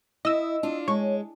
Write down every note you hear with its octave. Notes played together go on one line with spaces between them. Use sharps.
E4 D#5 E6
D4 F4
G#3 C#5